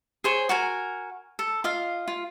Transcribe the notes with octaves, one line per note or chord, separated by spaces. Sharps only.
G#4 C5 C#5
F#4 A#4 G#5
A4
F4 D#5 F5
F4